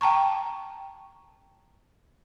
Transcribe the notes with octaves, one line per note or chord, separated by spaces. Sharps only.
G5 A5 A#5 C#6